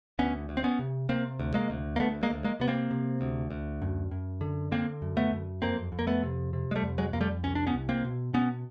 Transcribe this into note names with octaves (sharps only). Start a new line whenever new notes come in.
D2 B3 C#4
D2
C4
B3 C#4
C3
C3 A#3 C4
D2
G#3 A#3
D2
A#3
D2 A3 B3
G#3 A#3
D2
G#3 A#3
C3 B3
A#3 C4
C3
D2
D2
F#2
F#2
D3
D3 A#3 C4
F#2
A3 B3
F#2
F2 A#3 C4
F2
A#3
A3 B3
C3
C3
G#3
G3 A3
F2
F#3 G#3
F2 A#3
G3 A3
C2 C#4
D4
B3 C#4
C2
A#3 C4
B2
B2 B3 C#4